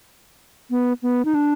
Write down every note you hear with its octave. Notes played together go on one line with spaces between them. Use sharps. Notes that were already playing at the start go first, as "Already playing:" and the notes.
B3
B3
D#4
D4